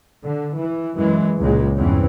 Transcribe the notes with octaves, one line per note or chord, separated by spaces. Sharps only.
D3
E3
F#2 E3 G#3
C#2 A#2 C#3 G#3
E2 G2 E3 C4 C#4